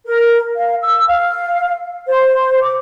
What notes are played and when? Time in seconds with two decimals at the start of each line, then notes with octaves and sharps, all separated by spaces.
0.06 A#4
0.55 F5
0.82 E6
1.07 F5
2.07 C5
2.61 D6